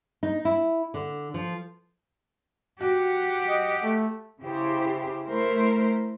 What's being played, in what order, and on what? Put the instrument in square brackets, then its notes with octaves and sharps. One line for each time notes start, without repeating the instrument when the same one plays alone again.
[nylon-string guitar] D#4
E4
D3
F3
[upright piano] F#4 [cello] G4 F#5
[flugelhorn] D#5
A3
[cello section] C#3 E4 G4 C5
A3 E4 A#4 C5